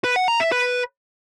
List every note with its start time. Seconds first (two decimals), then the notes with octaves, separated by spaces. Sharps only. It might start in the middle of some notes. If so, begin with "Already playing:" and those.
0.04 B4
0.16 F#5
0.28 A#5
0.40 E5
0.52 B4